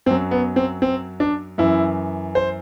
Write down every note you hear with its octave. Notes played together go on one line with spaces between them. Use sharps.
F#2 F#3 C4
B3
C4
C4
D4
F#2 E3 E4
C5